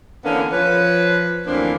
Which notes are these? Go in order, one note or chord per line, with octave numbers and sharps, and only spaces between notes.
D3 E3 A#3 B3 C#4 D4
F3 B4 C#5
D2 E3 F3 A#3 C4 D4